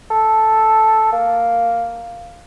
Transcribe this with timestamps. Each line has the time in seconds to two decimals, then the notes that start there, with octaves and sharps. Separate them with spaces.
0.11 A4
1.12 A#3